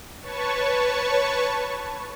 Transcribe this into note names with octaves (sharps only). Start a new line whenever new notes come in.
B4 C#5 A5 C#6